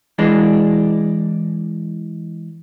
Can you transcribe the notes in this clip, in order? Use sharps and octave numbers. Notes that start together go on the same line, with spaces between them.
E3 G#3 D4